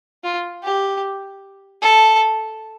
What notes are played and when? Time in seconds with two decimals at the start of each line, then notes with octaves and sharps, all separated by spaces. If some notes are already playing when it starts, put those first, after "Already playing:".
0.24 F4
0.63 G4
1.82 A4